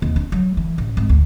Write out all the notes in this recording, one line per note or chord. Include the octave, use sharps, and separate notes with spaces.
D#2
D4
F#3
E3
A1
G#1
D2